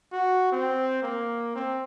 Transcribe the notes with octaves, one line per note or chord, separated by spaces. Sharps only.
F#4
C4
A#3
C4